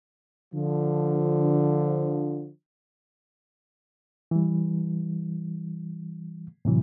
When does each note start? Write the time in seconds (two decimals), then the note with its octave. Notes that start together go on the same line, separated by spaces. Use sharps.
0.53 D3 F3
4.31 E3 G3
6.65 A2 C3 E3 F#3